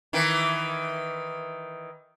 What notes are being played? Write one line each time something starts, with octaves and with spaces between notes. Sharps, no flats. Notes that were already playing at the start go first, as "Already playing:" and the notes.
D#3 E3